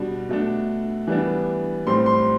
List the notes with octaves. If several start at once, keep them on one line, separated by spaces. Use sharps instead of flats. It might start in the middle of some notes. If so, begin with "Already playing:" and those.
Already playing: B2 G3 D4
B2 A3 D4
E3 G3 B3 D4
A2 G3 C4 C6
C6